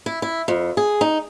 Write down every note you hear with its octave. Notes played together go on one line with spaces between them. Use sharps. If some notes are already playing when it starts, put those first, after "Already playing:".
E4
E4
F2
G#4
D#4